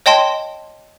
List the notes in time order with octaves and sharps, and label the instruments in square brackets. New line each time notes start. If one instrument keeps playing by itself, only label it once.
[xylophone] C#5 D#5 G5 A5 C6